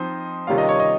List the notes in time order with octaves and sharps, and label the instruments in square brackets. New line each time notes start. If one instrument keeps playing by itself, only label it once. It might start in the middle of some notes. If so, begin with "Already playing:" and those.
Already playing: [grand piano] F3 C4 D#4 C5
C3 D#3 G3 C#4 F4 F5
D#5
C#5
D#5